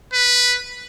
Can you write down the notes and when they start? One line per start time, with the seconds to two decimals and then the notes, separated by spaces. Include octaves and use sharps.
0.13 B4